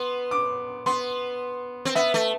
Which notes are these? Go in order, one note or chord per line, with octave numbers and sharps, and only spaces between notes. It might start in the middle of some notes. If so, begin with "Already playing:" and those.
Already playing: B3 C6
D6
B3 C6
C4
B3 E5
A3